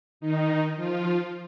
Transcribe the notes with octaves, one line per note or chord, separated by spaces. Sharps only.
D#3 D#4
F3 F4